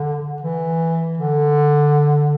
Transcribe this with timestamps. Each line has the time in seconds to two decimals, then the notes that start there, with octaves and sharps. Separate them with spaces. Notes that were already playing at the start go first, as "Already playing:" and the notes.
Already playing: D3
0.42 E3
1.18 D3